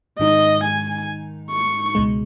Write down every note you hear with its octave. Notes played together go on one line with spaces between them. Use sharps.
G#2 D#3 G#3 D#4 D#5
G#5
C#6
C#2 B2 G#3